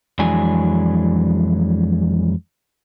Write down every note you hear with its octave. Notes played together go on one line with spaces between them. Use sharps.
F2 E3 F#3 G#3 D4 G#5